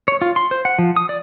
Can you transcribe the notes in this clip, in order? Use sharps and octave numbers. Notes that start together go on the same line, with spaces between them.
C#5
F4
C6
C5
F#5
F3
D#6
D5